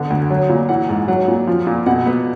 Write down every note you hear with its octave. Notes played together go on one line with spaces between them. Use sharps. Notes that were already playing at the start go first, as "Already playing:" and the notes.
Already playing: D3 B3
D2
F#3
A#2
E3 F#5
G#2
F#3 F#5
A#2
F3
A#2
B2 F#5
B3